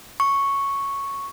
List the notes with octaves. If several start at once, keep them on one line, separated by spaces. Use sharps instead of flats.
C#6